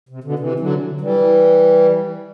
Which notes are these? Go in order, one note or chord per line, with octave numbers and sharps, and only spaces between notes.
C3
B2 D3
C3 E3
D3 F#3
E3 G3